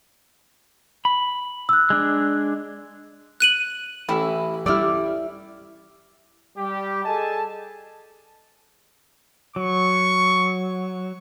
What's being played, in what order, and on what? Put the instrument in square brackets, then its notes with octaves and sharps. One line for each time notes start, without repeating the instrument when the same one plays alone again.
[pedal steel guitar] B5
[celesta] E6 F#6
[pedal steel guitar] G#3 D4
[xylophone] F#6 D#7 F#7
[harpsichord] A1 [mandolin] E4
[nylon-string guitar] G3 E4 [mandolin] D5 E6 F6
[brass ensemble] G3 G4
G#4 A4 D#5 G#5 A5
[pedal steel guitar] F#3 [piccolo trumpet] C#6